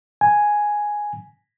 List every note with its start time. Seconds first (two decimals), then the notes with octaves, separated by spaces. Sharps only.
0.21 G#5